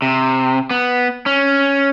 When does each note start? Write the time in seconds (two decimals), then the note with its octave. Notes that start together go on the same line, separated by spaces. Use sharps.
0.02 C3
0.71 B3
1.26 C#4